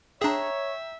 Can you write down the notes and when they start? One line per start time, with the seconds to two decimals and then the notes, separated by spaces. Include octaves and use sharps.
0.22 D4 G#4 C#5 E5 G5 A#5